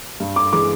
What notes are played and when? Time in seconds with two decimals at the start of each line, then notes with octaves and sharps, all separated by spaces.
0.20 G2
0.36 D6
0.53 E3 G#3 D6